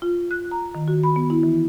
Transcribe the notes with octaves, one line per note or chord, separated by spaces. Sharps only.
F4
F#6
A#5
D#3
F#4
B5
B3
E4
E3